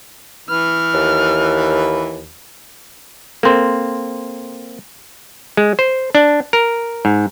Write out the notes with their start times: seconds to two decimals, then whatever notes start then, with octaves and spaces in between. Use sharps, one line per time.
0.49 E3 B4 F6
0.94 D#2
3.43 A#3 C4 A4 A#4 C6
5.57 G#3
5.79 C5
6.15 D4
6.53 A#4
7.05 G#2